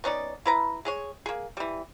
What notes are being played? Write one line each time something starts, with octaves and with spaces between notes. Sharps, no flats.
B3 C#4 D#4 D5
E4 B4 A#5
G#3 G#4 C#5
A#3 G#4
E3 G3